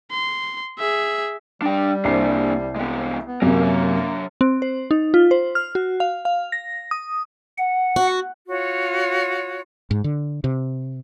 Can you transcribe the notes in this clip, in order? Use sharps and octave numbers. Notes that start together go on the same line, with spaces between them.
C6
G#4 E5
G3 D4 G5
C2 A#3 D4 C5 C7
G#3 B3
B3
F#2 C3 G#3 A#3 A#4
F#3 E5
C4
C5
D#4
F4
C5
F6
F#4
F5
F5
A#6
D#6
F#5
F#4
F4 F#4 C#5
G#2
D3
C3